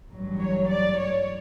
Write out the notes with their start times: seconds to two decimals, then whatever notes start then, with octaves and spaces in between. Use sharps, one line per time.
0.11 A1 G2 F#3
0.41 C#5
0.71 D5
0.99 C#5